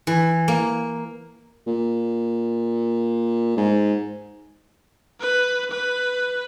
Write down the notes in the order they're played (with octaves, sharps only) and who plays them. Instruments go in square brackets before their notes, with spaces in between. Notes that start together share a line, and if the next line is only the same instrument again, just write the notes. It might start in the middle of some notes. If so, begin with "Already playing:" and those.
[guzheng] E3
A#3
[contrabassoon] A#2
G#2
[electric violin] B4
B4